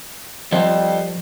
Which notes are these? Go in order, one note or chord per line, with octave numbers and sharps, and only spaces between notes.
F3 G3 A4 C5 D#5